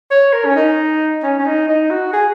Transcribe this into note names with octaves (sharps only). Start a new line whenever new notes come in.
C#5
A#4
C#4
D#4
C#4
C#4
D#4
D#4
F#4
G#4